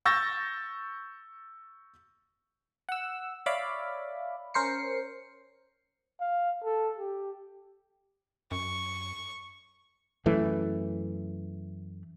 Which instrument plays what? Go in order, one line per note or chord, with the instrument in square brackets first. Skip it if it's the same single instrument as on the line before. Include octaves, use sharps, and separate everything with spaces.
[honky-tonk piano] C#6 E6 G6 A6 A#6
[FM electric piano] F#5 E6
C#5 D5 E5 F5 B5 D6
C#4 A#4 C5 C7 C#7
[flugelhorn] F5
A4
G4
[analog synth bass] F#2 [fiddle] C#6
[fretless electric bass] F#2 E3 A3